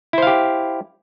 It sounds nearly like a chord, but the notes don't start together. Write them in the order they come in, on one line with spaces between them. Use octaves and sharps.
E4 C5 F5 G4